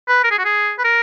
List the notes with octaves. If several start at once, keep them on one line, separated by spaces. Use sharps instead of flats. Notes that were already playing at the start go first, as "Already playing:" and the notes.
B4
A#4
G#4
F#4
G#4
B4
A#4